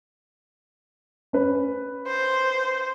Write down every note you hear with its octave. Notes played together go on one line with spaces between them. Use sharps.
C#4 B4
C5